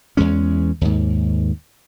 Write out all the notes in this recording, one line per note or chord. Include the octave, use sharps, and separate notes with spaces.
E2 G#3 C#4
D#2 G#2